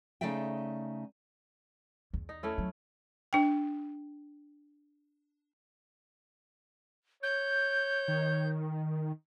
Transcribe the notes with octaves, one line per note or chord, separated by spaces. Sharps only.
C#3 A3 D#4 D5 E5 G5
E2
D#4
A3 C#4 E4
F#3
D4 G5
C#5 G6
D#3